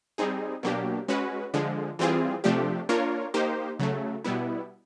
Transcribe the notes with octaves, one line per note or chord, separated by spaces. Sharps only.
G3 C4 D#4 G#4
B2 F#3 A#3 D4 G4
G#3 C#4 F#4 B4
D3 F3 G#3
E3 G3 C4 F4 G#4
C3 F3 A3 D4 G4
A#3 D4 F4 A#4 C#5
A#3 D#4 G4 C5
C#3 F#3 A3
B2 G3 B3 E4